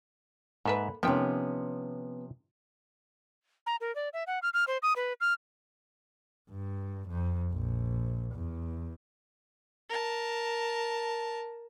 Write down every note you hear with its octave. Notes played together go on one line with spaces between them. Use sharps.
G#2 A#3 A4 B4 E5
C3 D#3 F3 B3 C#4 G5
A#5
A#4
D5
E5
F#5
F6
F6
C5
D#6
B4
F6
G2
F2
A#1
E2
A#4 A5